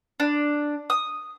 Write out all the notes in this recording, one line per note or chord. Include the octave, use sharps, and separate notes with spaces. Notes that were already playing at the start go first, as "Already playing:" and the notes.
D4
D#6